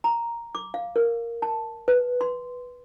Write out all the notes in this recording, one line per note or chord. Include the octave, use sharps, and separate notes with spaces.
A#5
D6
F5
A#4
A5
B4
C6